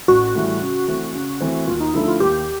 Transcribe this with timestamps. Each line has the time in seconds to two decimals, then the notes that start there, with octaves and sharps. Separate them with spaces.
0.08 A1 F#4
0.35 A2 E3 G3
0.62 C#3
0.88 E3 A3 C4
1.15 C#3
1.40 E3 A3 C4
1.67 D#2 F4
1.80 D#4
1.94 D3 F3 A3 E4
2.08 F4
2.20 D#2 G4